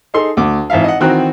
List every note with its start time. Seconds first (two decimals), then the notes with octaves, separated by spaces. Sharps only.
0.14 D#4 G#4 A4 C6
0.37 D2 D6
0.70 G#1 E3 E4 E5 F5
0.84 D#5 F#5
1.00 D#3 E3 C4 F#4 A#5 F#6